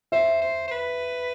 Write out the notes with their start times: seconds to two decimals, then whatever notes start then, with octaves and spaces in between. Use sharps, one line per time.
0.12 C5 E5
0.41 C5
0.68 C5
0.71 B4